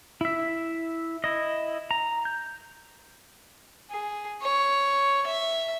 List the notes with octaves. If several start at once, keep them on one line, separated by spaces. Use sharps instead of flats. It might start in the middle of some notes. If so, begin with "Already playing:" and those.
E4 E5
E4 D#5
A#5
G6
G#4
C#5
E5